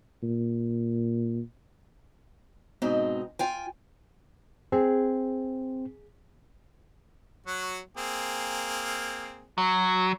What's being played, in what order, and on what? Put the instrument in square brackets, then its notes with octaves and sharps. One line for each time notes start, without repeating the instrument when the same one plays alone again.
[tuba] A#2
[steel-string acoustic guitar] G#2 B2 C4 D#4
F4 G5 G#5
[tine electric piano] C4 [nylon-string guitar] G#4
[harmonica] F#3 F#4
A#3 C4 G#4
[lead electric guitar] F#3